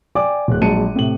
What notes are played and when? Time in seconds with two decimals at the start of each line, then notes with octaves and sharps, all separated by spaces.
0.15 D5 G5 G#5 D6
0.48 D1 F#6
0.61 A#1 F#3 G#3 A5 C#7 D#7
0.96 A2 C3 F#7